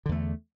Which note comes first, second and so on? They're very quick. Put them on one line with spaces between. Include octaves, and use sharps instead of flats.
D3 E2 A3